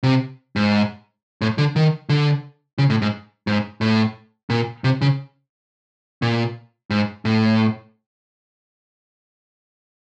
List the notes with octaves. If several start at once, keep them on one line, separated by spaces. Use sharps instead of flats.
C3
G#2
A2
D3
D#3
D3
C#3
A2
G#2
G#2
A2
A#2
C3
C#3
A#2
G#2
A2